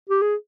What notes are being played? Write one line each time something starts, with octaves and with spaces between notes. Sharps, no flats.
G4
G#4